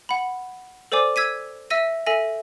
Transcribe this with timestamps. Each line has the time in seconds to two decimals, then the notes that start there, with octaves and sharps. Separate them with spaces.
0.09 F#5 B5
0.92 A4 C5 D5 G#5 D6
1.16 E6 G#6 B6 D#7
1.70 E5 E6 A#6 D#7
2.06 A4 E5 G#5 A#6